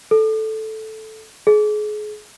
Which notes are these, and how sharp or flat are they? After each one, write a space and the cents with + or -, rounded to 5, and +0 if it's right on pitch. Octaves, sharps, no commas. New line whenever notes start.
A4 -5
G#4 +30